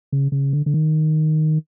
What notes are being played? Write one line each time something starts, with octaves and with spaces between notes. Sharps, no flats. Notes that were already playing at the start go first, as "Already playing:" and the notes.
C#3
C#3
D3
D3
D#3